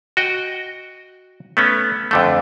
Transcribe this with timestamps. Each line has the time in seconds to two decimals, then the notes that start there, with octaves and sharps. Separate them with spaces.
0.17 F#4 D#5 G5
1.57 A3 B3 C#4
2.11 F2 D3 A3